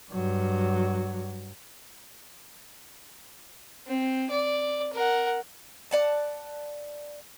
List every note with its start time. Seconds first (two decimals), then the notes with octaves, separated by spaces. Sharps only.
0.12 G2 F#3
3.87 C4
4.30 D5
4.93 A#4 F#5
5.91 D5 F#5 A5